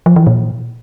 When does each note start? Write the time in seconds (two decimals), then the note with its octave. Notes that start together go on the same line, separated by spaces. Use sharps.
0.06 F3
0.16 E3
0.27 A#2